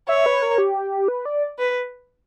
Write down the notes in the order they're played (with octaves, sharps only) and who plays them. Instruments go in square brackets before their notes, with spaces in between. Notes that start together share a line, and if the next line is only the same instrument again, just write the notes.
[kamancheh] C#5 [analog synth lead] E5
[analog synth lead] B4
A#4
G4
B4
D5
[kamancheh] B4